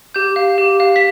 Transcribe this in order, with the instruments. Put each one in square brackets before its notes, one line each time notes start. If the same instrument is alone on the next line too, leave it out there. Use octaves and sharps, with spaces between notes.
[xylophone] G4 G6
F5
G4
F5
B6